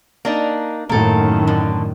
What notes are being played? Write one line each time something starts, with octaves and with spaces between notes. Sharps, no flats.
A#3 D4 D#4
F#2 A2 D#3 A#3 A4
D3